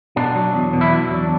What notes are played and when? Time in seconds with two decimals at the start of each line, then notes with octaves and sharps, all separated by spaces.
0.16 B2 D4
0.35 F#3
0.54 E2
0.73 B2
0.81 E4
0.92 E2 D4
1.11 F#3